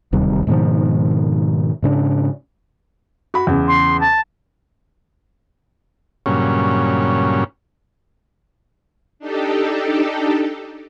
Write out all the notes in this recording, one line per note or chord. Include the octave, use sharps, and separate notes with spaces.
D1 D#2 C3 G3
G#2 B2 D#3 F3
G#2 C#3 C4 D4
F#4 B5
E2 C#3
C6
A5
G2 A#2 C#3 F#3 C#4
D4 D#4 G4 A4